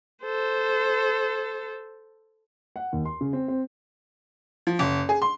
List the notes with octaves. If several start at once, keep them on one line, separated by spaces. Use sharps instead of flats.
A4 C5
F#5
D#2
C6
C#3
C4
C4
F3
F#1
G#4
C6